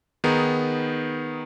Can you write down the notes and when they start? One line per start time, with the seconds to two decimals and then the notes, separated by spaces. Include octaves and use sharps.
0.24 D#3 B3 D#4 G#4